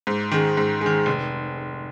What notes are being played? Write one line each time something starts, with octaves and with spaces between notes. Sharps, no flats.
G#2
D#3 G#3
G#2
D#3 G#3
F1